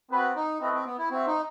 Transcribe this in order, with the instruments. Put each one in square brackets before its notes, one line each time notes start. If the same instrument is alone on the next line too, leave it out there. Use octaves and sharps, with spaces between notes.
[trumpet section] B3 F#4 B4 [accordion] C4
[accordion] D#4
[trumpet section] A3 E4 B4 D#5 [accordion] C4
[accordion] C4
B3
E4
[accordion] C4 [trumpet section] F#4 C5 E5
[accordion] D#4